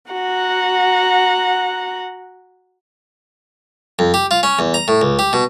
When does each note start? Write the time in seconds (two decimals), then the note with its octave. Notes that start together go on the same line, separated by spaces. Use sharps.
0.11 F#4 F#5 A#5
3.99 F2
4.14 G4
4.31 F4
4.43 C#4
4.59 E2
4.74 A#5
4.88 A2
5.01 C#2
5.19 G4
5.33 B2